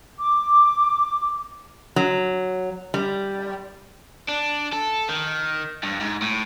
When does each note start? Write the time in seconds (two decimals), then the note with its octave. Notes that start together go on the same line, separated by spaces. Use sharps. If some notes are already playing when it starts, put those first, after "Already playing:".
0.19 D6
1.96 F#3
2.94 G3
4.28 D4
4.72 A4
5.09 D#3
5.83 G2
6.00 G#2
6.22 A2